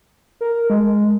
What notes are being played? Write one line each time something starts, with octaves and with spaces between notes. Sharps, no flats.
A#4
G#3